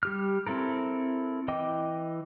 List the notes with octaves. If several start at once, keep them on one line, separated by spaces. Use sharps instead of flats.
G3 G4 F6
C4 E4 A4 A#4
E3 D#5 G5 D6